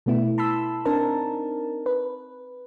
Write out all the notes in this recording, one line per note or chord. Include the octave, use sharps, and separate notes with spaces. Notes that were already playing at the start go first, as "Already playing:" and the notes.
B2 A3 B3 E4
A5 B5 C6 E6
C4 D4 D#4 A#4 A5
B4